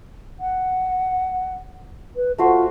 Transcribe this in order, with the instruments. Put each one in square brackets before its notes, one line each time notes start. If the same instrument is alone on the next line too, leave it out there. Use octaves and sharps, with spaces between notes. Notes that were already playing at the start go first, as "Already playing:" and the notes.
[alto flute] F#5
B4
[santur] A3 F#4 C5 [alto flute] F4